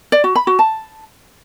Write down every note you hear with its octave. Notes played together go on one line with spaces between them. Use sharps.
D5
F#4
B5
F#4
A5